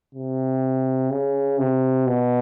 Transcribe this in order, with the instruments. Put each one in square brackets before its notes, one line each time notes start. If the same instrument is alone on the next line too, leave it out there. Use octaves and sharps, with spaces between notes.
[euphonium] C3
C#3
C3
B2